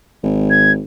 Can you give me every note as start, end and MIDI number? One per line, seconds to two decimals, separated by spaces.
0.23 0.84 32
0.50 0.72 92